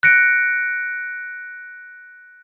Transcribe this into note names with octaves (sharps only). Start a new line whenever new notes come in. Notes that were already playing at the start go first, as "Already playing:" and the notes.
F#6 A#6 C#7 D7